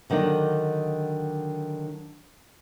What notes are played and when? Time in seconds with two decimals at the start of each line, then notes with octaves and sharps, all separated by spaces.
0.10 D3 D#3 F#3 D4 D#5